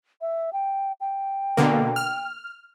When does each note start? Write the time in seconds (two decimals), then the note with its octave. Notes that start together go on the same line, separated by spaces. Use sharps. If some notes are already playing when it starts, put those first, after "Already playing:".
0.21 E5
0.53 G5
1.01 G5
1.57 B2 D3 A#3
1.96 F6